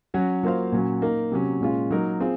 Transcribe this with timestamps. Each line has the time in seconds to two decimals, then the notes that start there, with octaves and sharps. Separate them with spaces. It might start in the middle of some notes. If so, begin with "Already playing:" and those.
0.14 F#3 C#4 F#4
0.43 F#3 A#3 F4 C5 F5
0.72 A#2 F#3 C#4
1.02 A#3 D#4 A#4
1.31 C3 F#3 C#4
1.61 A#2 G#3 C#4 F4
1.91 F#3 A#3 D#4 A#4
2.20 C4 F4 G#4